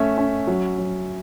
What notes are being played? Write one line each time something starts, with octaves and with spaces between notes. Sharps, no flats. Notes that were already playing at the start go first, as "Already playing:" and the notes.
Already playing: A3 C#4 E5
C#4
F#3
F#3